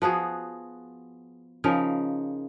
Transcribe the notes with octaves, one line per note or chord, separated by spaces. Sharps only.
F3 B3 F#4 G#4
C#3 F3 D#4 A#4